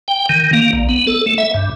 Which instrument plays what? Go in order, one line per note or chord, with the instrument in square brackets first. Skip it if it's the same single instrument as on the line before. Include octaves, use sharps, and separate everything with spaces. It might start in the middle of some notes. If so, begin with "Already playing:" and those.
[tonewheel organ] G5
D#3
A#3
A#1
B3
A4
A3
E5
G2